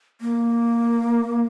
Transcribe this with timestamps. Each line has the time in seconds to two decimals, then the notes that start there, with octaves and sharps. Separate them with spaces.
0.21 A#3